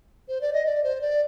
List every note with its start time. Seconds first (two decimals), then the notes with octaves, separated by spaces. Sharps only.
0.28 C5
0.41 D5
0.53 D#5
0.66 D5
0.84 C5
1.01 D5